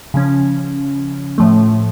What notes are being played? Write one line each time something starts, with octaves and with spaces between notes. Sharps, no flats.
C#3 F3 C#4
A2 F3 A3